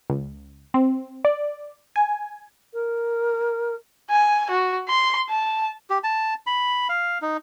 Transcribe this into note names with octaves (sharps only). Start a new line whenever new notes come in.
C#2
C4
D5
G#5
A#4
G#5
F#4
C6
A5
G4
A5
B5
F5
D#4